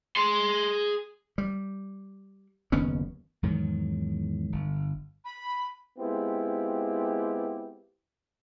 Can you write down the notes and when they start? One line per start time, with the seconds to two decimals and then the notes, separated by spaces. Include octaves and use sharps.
0.16 G#4 C6
1.38 G3
2.72 F#1 D#2 B3 C#4
3.43 E2 G#2 D#3 F#3
4.52 G1
5.25 B5
5.99 G#3 B3 C4 E4 F4 G4